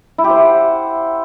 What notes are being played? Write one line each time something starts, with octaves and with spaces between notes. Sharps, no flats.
E4
G4
C5
F#5